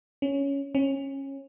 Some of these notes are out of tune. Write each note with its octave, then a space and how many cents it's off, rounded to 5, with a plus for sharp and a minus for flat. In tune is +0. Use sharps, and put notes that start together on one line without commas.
C#4 +5
C#4 -20